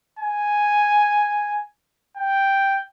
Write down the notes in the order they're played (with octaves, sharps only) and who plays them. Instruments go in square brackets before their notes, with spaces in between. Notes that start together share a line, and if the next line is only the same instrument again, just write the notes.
[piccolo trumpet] G#5
G5